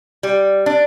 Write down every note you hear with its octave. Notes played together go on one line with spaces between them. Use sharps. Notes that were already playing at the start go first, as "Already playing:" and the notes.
G3
D4